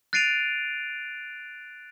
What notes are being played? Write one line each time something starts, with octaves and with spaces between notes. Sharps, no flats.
F#6 A6 C7 D7 D#7 F7